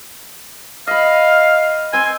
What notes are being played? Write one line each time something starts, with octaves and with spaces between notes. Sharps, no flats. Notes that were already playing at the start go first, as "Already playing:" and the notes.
D#5 F5 B5
C4 G#5 C6